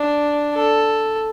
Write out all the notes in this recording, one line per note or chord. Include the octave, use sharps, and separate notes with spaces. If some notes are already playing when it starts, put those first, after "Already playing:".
Already playing: D4
A4